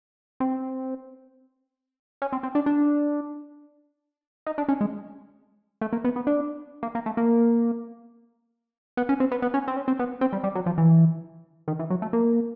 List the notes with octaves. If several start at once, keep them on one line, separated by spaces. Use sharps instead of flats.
C4
C#4
C4
C4
D4
D4
D#4
D4
C#4
G#3
A3
A#3
B3
B3
D4
A#3
A#3
A3
A#3
B3
C#4
C4
B3
B3
C#4
C4
C#4
C4
B3
C4
G3
G3
F#3
F3
E3
D#3
E3
F#3
A3
A#3